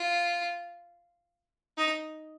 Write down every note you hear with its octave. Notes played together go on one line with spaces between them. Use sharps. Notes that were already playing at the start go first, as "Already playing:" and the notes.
Already playing: F4
D#4